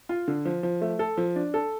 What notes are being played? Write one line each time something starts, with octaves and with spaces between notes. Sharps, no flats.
F4
D3
F3
F3
A3
A4
F3
D4
A4